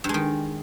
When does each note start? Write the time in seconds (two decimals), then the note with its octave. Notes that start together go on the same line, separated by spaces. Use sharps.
0.04 G2
0.09 G#3
0.14 D#3